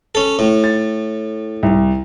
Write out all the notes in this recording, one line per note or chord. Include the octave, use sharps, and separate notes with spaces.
C#4 A4
A2
A6
C2